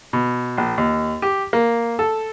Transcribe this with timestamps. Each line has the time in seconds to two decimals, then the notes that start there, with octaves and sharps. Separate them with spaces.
0.13 B2
0.58 A#1
0.78 D#2
1.22 G4
1.53 A#3
1.99 A4